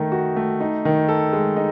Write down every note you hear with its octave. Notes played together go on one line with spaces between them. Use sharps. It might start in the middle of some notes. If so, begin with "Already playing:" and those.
Already playing: D#3 A3 D#4
F#4
A3
D#4
D#3
A4
G#3
D#4